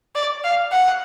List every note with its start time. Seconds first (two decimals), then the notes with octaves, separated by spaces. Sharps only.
0.15 D5
0.44 F5
0.72 F#5